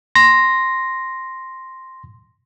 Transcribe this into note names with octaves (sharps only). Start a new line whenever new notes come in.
C6 A#6